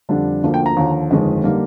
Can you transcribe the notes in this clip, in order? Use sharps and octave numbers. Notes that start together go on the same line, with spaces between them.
F2 D3 G3 D4
D2 D3 F3 A#3
G5
A#5
D#2 D3 F3
G1 F2 D#3 G#3
D3 G3 A#3 D#4